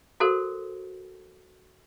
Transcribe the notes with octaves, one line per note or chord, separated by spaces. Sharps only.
F#4 A4 A#4 C5